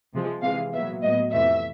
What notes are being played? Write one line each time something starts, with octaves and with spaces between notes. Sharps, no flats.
C3 F3 G#3
C3 E3 G#3 F5
A#2 F#3 B3 E5
A2 F#3 B3 D#5
F2 C3 E3 A3 E5